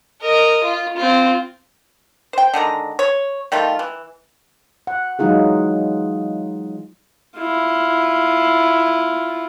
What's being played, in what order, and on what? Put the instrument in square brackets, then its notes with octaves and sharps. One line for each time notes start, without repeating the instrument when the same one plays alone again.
[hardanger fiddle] A#4 D#5
F4
C4 F4
[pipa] C5 G5
D3 D#3 G#3 A#5
C#5
D#3 G3 A3 F4
E3
[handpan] F#5
E3 F#3 G#3 D#4 F4 G#4
[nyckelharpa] E4 F4